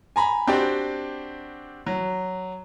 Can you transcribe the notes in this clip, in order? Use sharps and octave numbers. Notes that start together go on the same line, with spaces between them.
G#5 A#5 B5
C4 D4 F#4 G4 D5 G5
F#3